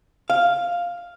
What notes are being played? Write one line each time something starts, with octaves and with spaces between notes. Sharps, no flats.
F5